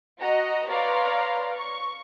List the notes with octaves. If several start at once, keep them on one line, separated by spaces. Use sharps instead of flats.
F#4 D#5 A#5
B4 C#5 D5 F5 A#5 C6
C#6